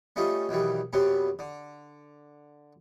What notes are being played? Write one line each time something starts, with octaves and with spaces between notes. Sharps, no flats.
G3 A3 C#4 D#4 F4
B1 D#3 E3 G3
F#2 C3 F#3 G3 B3
D3